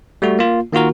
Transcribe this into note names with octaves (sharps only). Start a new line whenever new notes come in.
G3 A3 F#4
A#3 F4
D#3 A#3 F4 F#4 A#4